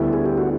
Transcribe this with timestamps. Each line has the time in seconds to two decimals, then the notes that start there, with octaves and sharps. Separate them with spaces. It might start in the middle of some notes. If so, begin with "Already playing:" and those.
Already playing: D2 D3 G3 B3 E4
0.13 G#4
0.26 G4
0.37 F#4